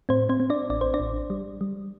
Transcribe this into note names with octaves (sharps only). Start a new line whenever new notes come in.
A2 C4 C5
C4 C5
C4
D4 D5
A1 D5
C5
D4 D5
A1
G3
G3